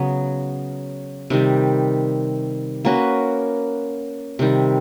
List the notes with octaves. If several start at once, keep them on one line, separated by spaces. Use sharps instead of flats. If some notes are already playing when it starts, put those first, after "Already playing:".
Already playing: C#3 F#3 B3
C3 D#3 G3
A#3 C#4 F#4 B4
C3 D#3 G3